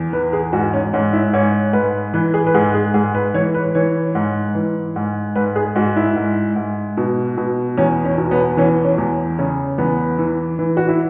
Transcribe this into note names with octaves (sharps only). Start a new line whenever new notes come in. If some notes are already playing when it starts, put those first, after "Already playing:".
Already playing: E2
E3 B4
G#4
G#2 F#4
C#4
G#2 C#4
E4
G#2 C#5
G#2 B4
E3 B4
G#4
B4
G#2 G#4
G#4
G#2 G#4
B4
E3 C#5
B4
E3 C#5
G#2
E3
G#2
G#2 B4
G#4
G#2 F#4
E4
G#2
G#2
B2
B2
E2 C#4
C#4
B2
B3
E3 C#4
C#4
E2
C#3 C#4
E2 B3
E3
E3
F#4
E4